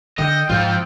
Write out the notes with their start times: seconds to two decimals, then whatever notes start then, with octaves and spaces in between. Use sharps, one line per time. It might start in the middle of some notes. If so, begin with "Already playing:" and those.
0.19 D3 D#5 G5
0.49 G#2 F3 C4 F4